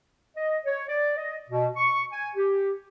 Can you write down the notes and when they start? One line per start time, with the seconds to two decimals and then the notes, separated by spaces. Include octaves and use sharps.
0.37 D#5
0.66 C#5
0.88 D5
1.18 D#5
1.50 B2
1.77 C#6
2.12 G#5
2.36 G4